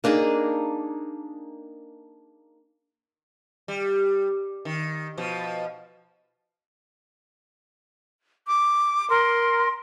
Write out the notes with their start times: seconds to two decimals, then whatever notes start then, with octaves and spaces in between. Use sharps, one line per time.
0.04 A#3 D4 D#4 G#4
3.68 G3
4.65 D#3
5.17 B2 F3
8.47 D6
9.10 A#4 C6